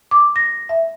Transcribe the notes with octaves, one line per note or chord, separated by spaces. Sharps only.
D6
A#6
E5